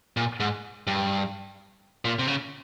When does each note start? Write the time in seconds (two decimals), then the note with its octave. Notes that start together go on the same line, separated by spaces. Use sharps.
0.17 A#2
0.40 G#2
0.87 G2
2.05 A#2
2.19 C3
2.28 C#3